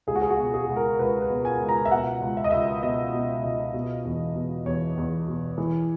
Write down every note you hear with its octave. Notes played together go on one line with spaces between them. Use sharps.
C#2 G#4
F#4
G#4
F#4
B2
G#4
C#2
A#4
C#2 B4
B4
B2
G#5
C#2
A#5
E5
B2 F#5
C#2
E5
D#5
C#2 E5
B2 D#5
B2
C#2
B2
E2
B2
E2 C#5
E2
B2
E3